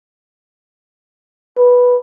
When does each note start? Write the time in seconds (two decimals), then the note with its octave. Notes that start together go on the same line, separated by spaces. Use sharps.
1.57 B4